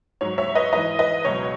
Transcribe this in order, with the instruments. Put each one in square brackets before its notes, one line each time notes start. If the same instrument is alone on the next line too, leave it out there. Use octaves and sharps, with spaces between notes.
[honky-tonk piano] G#2 F#3 C#5
C#5 E5
B4 D#5
G#2 E3 B4 D#5
B4 D#5
C#2 B2 F#3 C#5